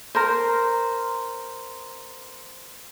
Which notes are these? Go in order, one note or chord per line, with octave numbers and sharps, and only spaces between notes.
A#4 C5